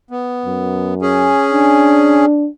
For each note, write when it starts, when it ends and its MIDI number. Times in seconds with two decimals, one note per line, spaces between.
0.11 0.94 59
0.46 1.33 42
1.02 2.25 61
1.02 2.25 68
1.52 2.49 62